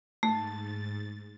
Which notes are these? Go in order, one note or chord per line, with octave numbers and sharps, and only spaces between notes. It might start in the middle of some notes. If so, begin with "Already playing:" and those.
G#2 A3 A6